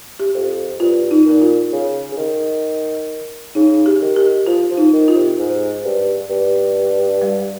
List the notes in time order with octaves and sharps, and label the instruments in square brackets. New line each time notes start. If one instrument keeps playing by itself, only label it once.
[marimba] G4
[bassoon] F2
[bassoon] G2 [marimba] F4
[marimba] D#4
[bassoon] A#2
[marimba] F4
[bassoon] C#3
C#3
D#3
[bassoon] C#3 [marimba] D#4
[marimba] G4
[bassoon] D#3
[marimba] G4
[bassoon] F3 [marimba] F4
[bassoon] F3
[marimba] D#4
[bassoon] D#3
[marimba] F4
[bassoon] C3
G#2
G2
G2
[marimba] G3